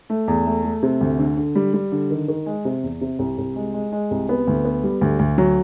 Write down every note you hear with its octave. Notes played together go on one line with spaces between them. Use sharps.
A3
E2
A3
A3
C3
D2
D3
D3
G3
G3
D3
D#3
D#3
G#3
C3
E2
C3
C2
C2
G#3
G#3
G#3
C2
B3
D2
B3
G3
D2
D2
F#3